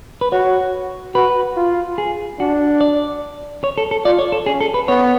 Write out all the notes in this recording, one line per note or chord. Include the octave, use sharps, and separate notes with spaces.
B4
F#4 C#5
F#4 B4
F4
G#4
D4 F#4
D5
C#5
A4
A4
F4 D5
C#5
A4
C#4 G#4
A4
B4
B3 C#5